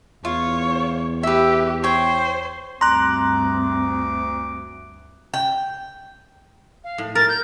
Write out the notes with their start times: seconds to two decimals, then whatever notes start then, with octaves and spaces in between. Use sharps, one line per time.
0.25 E2 F4 C#5
1.23 G4 B4 E5
1.84 C5 C#5 G5
2.81 D2 G2 C4 A#5 C6 D6 F#6
5.34 G5
6.84 F5
6.98 A2
7.15 A#4 A6
7.29 G6